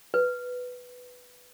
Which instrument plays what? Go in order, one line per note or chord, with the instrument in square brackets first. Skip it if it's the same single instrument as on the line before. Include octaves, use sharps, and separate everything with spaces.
[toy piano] B4